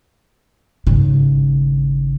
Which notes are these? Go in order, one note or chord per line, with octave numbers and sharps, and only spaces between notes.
G#1 C#3